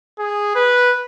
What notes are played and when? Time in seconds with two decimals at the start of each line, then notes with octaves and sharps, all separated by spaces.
0.19 G#4
0.55 B4